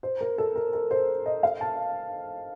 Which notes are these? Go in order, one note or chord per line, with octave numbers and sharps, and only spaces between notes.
C5
A#4
A4
A#4
A#4
C5
D#5
F5
A5